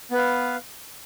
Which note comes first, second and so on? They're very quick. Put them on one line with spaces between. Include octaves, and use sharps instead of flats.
B3 B4 F5